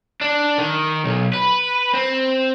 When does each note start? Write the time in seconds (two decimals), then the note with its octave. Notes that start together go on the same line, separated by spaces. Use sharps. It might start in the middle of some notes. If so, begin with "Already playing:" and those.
0.21 D4
0.58 D#3
1.04 B1
1.33 B4
1.93 C4